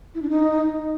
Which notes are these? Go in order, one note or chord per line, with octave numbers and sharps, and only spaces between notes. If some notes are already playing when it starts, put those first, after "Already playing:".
E4
D4
D#4